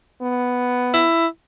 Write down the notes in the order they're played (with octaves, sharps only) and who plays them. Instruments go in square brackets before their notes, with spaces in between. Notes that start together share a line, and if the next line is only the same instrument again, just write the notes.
[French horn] B3
[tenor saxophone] E4